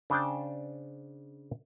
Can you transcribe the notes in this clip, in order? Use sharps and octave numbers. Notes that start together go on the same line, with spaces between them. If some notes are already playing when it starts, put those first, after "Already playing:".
C#3 D4 C5 G5 A5